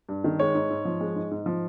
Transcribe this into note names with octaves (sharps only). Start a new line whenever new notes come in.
G2
D#3
G#3 C#5
G#2
G#2
F3
G#3
G#2
G#2
F3